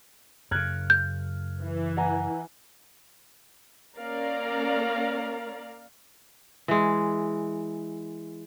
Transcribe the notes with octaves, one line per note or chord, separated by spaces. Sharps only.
F#2 C#3 F6 F#6 G#6
G6
E3
F#5 G#5 A#5
A#3 C#4 A#4 D5 F5 A#5
E3 G#3